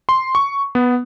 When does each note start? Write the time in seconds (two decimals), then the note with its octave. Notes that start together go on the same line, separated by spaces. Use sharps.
0.09 C6
0.35 C#6
0.75 B3